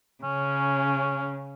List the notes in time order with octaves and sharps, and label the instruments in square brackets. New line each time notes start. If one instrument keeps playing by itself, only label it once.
[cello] C#3 [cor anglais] C#4